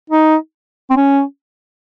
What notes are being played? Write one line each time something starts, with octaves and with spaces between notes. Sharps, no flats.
D#4
C4
C#4